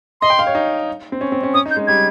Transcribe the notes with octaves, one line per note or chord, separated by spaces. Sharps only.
D#5 C6
G5
F5
C#5
D#4
C4
C#4
C4
C#4
C#4 D#6
D#4
G6
G#3
G3 G#6